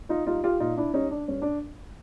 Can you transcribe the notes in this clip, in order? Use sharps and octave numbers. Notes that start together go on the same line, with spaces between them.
D#4 F4
G3 D#4 F4
F4 G4
A#2 D#4 F4
D4 E4
G3 C#4 D#4
D4
G2 C#4
D4